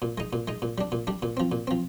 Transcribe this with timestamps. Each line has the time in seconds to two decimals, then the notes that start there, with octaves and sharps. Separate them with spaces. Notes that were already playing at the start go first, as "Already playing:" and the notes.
0.02 A#2
0.18 G#3 D#4
0.33 A#2
0.48 G#3 D#4
0.62 A#2
0.78 G3 D4
0.92 A#2
1.07 G3 D4
1.22 A#2
1.37 F3 C4
1.52 A#2
1.67 F3 C4